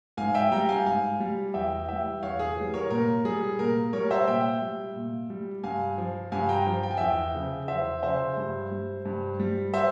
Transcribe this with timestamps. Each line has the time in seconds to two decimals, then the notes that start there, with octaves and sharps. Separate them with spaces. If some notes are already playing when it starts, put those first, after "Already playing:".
0.17 G#2 F5 G#5
0.34 E5 G5
0.51 G3 G5 A#5
0.69 F5 G#5
0.86 G#2 F5 G#5
1.20 G3
1.54 E2 E5 G5
1.89 E3 G3 E5 G5
2.22 E2 C#5 F5
2.39 G#4
2.57 E3 G3
2.74 A#4 C#5
2.90 A#2 A#4
3.25 G3 G#4
3.59 A#2 A#4
3.93 G3 A#4 C#5
4.11 C5 E5
4.27 A#2 E5 G5
4.62 G3
4.96 A#2
5.30 G3
5.64 G2 F5 G#5
5.98 F3
6.32 G2 F5 G#5
6.49 G5 A#5
6.67 F3
6.83 G5
6.91 G#5
6.97 E2 E5 G5
7.34 C#3 F3
7.68 E2 C5 E5
8.03 C#3 F3 C5 E5
8.37 G2
8.71 G3
9.05 G2
9.40 G3
9.74 C5 E5